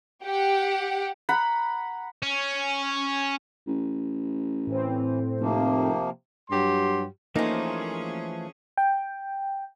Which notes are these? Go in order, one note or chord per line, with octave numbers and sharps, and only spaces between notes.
G4 F#5
F#5 A#5 B5
C#4
A1
A2 E3 C4
F1 C3 F3 A#3
G2 F#3 G4 C6
E3 F3 A3 A#3 C#4 D#4 G#4 C5
G5